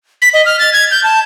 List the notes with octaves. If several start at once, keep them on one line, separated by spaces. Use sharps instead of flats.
B6
D#5
F6
A6
G#6
G6
A5